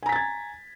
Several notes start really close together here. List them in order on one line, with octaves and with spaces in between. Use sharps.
G#5 A#5 B6 A6 G#6